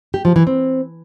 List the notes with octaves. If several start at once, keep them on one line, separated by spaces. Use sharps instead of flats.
G4
F3
E3
C4